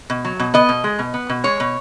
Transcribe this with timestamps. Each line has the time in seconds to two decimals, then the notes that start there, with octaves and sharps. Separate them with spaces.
0.10 B2
0.25 F#3
0.39 B2
0.54 B3 D#5
0.69 B2
0.84 G#3
0.99 B2
1.14 B3
1.29 B2
1.44 G#3 C#5
1.60 B2